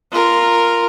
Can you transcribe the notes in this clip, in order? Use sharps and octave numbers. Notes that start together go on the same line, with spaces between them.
F4 A#4